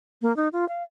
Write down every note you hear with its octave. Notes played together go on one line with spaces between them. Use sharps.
A#3
D#4
F4
F5